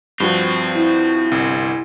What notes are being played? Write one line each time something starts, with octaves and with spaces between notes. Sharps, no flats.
G2 F3 C4 F#4
E4
G1 C2